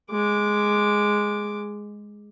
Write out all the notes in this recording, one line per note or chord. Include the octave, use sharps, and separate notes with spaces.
G#3 D6